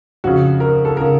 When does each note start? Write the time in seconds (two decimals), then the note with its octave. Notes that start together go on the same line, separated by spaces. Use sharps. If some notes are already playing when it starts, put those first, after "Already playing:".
0.24 F2 C#3 F#4
0.60 A#4
0.85 A4
0.97 C#3 A#4